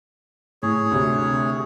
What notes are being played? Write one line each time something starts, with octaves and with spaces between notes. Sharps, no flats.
A2 G#4 C#5
D2 C3